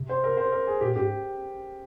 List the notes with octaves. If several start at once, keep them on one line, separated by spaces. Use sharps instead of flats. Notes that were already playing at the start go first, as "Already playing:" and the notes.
Already playing: C3
C5
A#4
C5
A#4
G#4
A#2 G4
G#2 G4